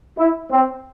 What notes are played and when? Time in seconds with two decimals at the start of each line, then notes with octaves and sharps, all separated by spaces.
0.18 E4
0.51 C4